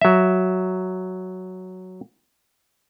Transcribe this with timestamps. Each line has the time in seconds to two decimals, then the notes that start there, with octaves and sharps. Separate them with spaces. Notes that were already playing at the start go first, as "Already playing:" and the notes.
0.01 F#3 E5